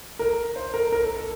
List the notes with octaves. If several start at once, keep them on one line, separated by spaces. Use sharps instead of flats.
A#4
C5
A#4
A#4
A4
A4